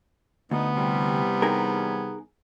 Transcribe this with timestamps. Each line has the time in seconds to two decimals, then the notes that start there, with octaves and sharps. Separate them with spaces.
0.51 D2 B3 D#4
0.75 C3 E3 G3
1.42 D#4 G#4 A#4